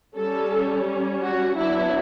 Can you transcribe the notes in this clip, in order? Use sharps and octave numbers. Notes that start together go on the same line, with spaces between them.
G3 C#4 A4
F#4
F#3 B3 D4 E4